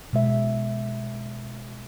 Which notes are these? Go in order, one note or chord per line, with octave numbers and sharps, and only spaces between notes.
B2 G#3 E5